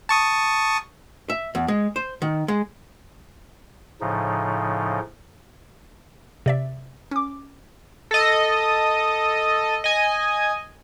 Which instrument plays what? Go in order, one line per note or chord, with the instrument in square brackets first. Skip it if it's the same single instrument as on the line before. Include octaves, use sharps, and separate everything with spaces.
[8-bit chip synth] A5 C#6 D#6
[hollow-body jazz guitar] E5
E2
G#3
C5
D#3
G#3
[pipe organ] A2 C#3 F3 D#4
[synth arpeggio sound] C3 D5 E5
C#4 D6
[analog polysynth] A4 D#5
D#5 G#5